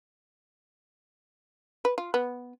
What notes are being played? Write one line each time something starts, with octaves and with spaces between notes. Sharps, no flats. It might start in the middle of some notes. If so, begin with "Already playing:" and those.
B4
F4
B3